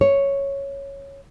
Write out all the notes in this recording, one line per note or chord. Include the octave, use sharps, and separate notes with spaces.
C#5